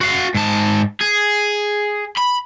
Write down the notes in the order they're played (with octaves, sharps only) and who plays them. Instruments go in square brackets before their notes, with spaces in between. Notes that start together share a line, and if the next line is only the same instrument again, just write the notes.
[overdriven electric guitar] F#4 F5
G#2 A5
G#4
B5